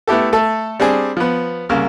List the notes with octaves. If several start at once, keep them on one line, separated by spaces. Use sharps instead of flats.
A3 B3 E4 G4 A4
A3 A4
G3 C4 D4 G#4
F3 B3
C2 C#3 A#3